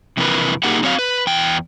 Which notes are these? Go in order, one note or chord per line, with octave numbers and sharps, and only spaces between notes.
F2 C3 E3 B3 A#4 B4
A#3 D#4 G4 G#4 A#4 F#5
F#3 C4 C#5 D#5 F5
B4
E2 G5